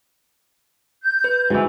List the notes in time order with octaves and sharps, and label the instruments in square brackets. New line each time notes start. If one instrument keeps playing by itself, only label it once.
[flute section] G6
[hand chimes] B4
[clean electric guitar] G#2 E3 [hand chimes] F#4